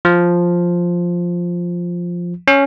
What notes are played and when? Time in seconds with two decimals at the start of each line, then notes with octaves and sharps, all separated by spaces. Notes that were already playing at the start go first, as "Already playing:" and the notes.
0.05 F3
2.48 C#4